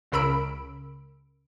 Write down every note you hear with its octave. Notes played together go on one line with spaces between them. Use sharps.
C#2 C#3 A#4 B5 E6 D7